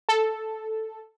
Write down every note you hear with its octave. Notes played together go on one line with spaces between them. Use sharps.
A4